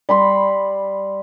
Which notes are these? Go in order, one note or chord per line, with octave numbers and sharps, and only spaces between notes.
G3 B5 C6